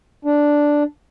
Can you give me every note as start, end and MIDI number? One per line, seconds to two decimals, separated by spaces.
0.25 0.83 62